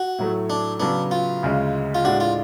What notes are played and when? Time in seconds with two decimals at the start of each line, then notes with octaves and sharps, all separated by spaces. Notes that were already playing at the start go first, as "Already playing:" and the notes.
Already playing: F#4
0.19 A2 F#3 A3
0.50 D4
0.80 C#3 F#3 B3 D4
1.11 F4
1.43 D2 C#3 G#3
1.95 F4
2.04 A2 G#3 D4 F#4
2.20 F4